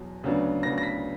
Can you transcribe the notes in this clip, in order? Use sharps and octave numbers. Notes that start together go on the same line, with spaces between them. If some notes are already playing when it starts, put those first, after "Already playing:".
Already playing: E2 B2 F#3
D2 C#3 F#3 B3 D4
D2 C#3 F#3 B3 D4 A#6
A#6
B6